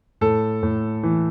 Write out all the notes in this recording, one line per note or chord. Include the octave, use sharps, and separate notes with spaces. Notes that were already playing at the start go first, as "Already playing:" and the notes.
A2 A4
A2
E3